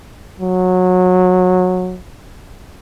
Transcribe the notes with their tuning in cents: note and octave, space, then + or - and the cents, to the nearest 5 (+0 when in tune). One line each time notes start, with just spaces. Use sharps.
F#3 -20